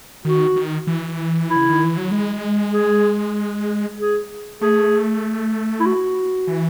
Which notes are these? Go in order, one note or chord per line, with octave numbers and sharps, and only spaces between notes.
D#3 F#4
D#3
E3
E4
C#3
D#3
E3
F#3
G#3
G#4
G#4
A3 G#4
E4
F#4
E3